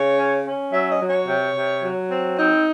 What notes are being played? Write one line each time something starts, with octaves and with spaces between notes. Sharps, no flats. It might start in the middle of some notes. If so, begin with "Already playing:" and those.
Already playing: C#3 C#5
C#4
C#4
F#3 E5
D#5
F#3
C#5
C3
C3
F#3
C4
C4 D#4